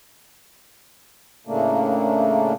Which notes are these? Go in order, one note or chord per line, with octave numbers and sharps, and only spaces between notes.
A2 C#3 A3 A#3 D4